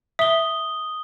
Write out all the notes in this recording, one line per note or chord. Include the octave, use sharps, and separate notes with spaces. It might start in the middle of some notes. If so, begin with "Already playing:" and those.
E5 D#6 G7